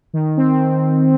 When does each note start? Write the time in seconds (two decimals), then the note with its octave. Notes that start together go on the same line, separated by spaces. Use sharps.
0.13 D#3
0.37 C4